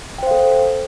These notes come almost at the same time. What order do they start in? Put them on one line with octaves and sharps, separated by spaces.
G5 C5 F5 A4